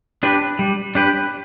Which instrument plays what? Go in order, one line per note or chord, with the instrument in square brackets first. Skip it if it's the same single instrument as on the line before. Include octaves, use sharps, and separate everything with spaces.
[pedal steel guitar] D4 G4 B4
G3
D4 G4 B4